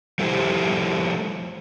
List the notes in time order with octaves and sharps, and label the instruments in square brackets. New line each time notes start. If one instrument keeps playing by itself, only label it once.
[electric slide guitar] F3 G3 A3 E4 G4 C5